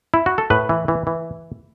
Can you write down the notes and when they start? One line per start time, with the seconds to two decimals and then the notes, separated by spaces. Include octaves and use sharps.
0.14 E4
0.26 F#4
0.38 A4
0.50 A2 B4
0.69 E3
0.88 E3
1.07 E3